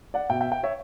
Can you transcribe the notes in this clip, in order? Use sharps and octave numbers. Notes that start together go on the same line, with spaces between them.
D5 F#5
B2 E5 G5
E5 G5
E5 G5
C#5 E5